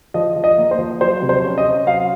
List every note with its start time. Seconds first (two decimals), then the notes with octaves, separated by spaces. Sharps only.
0.14 F3 D#5
0.36 F3
0.44 D#5
0.58 A#3
0.71 C5
0.79 F3
1.00 F#3 C5
1.22 C3
1.29 C5
1.44 C#4
1.58 D#5
1.65 C#4
1.86 F#3 F5